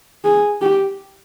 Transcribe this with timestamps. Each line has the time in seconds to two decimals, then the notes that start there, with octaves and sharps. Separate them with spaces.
0.24 G#4
0.61 G4